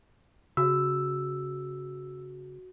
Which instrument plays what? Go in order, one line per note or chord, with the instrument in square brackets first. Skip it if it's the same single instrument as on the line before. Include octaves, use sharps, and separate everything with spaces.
[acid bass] C#3 [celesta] F#4 [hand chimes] E6